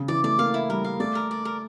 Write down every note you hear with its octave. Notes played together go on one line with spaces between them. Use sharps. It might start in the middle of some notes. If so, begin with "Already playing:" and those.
Already playing: C#3
E3 D5
A3 D5
A#3 F5
E4
G3 A#4
F5
A3 D5
A#4
D5
A#4